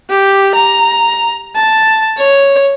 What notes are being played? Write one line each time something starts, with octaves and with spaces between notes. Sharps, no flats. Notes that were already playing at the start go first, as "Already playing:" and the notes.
G4
A#5
A5
C#5